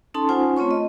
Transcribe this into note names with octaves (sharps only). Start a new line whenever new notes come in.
C#4 D#4 A4 A5 C6
C#4 D#4 F4 C5 F#5 G#5
A3 C4 F4 C#5 C#6
D#5